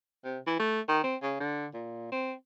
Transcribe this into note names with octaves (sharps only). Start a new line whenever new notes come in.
C3
E3
A3
D#3
C4
C#3
D3
A#2
C4